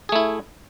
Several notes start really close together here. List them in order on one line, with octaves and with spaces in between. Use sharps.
G#4 A3 E4